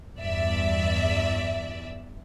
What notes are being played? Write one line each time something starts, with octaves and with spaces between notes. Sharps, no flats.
E2 G2 D5 E5